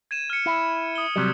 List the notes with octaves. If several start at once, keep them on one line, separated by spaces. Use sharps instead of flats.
G#6 D#7 E7
F6 C#7
E4
D#6 G7
C3 F#3 G3